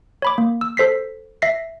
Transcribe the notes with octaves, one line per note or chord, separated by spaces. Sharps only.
C#5 B5 D6
A#3
E6
A4 C5 B6 C7
E5 A#6 C7